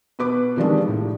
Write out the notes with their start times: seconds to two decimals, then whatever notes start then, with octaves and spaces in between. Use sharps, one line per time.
0.19 B2 B4 D6
0.56 C3 D#3 F3 G3 G#3 D4
0.88 A2